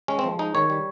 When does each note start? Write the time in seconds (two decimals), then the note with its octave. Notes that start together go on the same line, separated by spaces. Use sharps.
0.08 G#3 C#4
0.19 C4
0.24 F3
0.39 G#3 D#4
0.55 D#3 C#5
0.70 G3